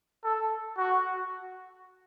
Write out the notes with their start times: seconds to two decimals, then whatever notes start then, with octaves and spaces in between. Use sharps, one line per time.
0.24 A4
0.78 F#4